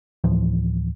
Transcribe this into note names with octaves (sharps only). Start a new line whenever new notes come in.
D2 A2 E3 F3